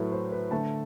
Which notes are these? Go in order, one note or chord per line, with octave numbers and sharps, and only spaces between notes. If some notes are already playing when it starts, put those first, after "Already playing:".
Already playing: A2 F#3 A3 B4
C5
B4
D3 A3 A5